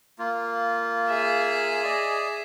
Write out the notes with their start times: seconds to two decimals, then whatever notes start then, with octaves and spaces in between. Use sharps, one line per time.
0.19 A#3 F4
1.08 G#4 E5
1.84 D5 D#5